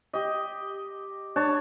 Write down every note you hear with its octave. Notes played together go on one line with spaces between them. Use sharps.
G4 D#5
D4 C#5 A5